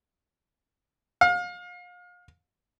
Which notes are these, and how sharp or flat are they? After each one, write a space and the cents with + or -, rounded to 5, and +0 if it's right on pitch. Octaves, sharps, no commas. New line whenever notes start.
F5 +35